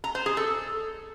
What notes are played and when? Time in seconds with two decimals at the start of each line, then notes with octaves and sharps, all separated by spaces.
0.04 A#5
0.15 C5
0.26 G#4
0.37 A4